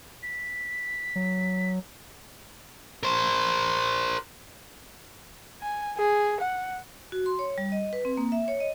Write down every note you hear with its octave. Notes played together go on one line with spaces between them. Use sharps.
B6
F#3
A#4 C5
G#5
G#4
F#5
F#4
C6
C#5
G3
D#5
B4
C4
A#3
E5
C#5
D#5